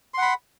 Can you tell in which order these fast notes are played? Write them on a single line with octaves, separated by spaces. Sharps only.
C6 F#5 B5